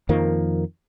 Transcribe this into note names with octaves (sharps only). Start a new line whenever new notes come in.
F2 D#3 F3 A#3